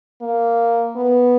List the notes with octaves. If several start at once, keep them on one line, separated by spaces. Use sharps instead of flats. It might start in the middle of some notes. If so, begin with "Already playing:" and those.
A#3
B3